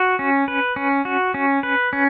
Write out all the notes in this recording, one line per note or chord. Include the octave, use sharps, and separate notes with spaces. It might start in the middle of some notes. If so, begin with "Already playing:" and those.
Already playing: F#4
C#4
B4
C#4
F#4
C#4
B4
C#4